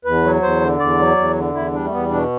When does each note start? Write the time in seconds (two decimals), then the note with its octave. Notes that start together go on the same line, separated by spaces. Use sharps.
0.05 E2 B4
0.24 F#3
0.42 E2 C5
0.61 D3
0.80 E2 D5
0.98 F#3
1.17 E2
1.35 D3
1.54 E2 E4
1.73 G3 D4
1.84 A3
1.91 E2 B3
2.10 B2 D4